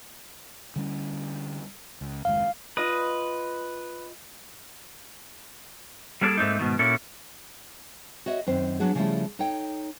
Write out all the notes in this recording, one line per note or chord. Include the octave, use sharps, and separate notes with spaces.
D3 G3 C#4
C#2
F#1 D#2 G#3 F5
F4 B4 D#5 D#6
G3 A#3 D4 F#4 G#4 A4
G#2 A3 A#3 C4 D#4
G#2 B2 D#3
A#2 A#3 C#4 E4 F#4 A4
F#4 C#5 D#5 E5
F#2 D#3 C4 C5
F#3 B3 D4 F#4 G#4
C#3 F3 G3 A3 C#4 E4
D#4 A4 C#5 G5